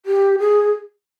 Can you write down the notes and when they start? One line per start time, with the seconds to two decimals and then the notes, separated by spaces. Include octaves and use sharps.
0.06 G4
0.39 G#4